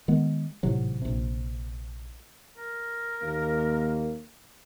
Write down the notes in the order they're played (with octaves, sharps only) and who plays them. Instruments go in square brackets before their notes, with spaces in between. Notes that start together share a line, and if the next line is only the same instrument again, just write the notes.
[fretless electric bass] D#3 G#3 B3
G#1 A2 C3 F#3
A#1 C3
[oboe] A#4
[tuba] D#2 [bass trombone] A#3